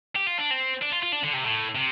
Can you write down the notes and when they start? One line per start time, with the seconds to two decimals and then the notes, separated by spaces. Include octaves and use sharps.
0.16 G4
0.27 F4
0.38 D4
0.51 C4
0.82 D4
0.92 F4
1.03 F4
1.12 D4
1.23 D3
1.33 C3
1.44 A2
1.75 C3